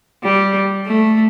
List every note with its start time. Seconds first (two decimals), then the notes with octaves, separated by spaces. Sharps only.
0.24 G3
0.86 A3